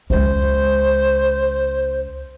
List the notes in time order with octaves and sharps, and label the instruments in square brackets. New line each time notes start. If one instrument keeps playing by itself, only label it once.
[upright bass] C#2 G#3 [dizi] C5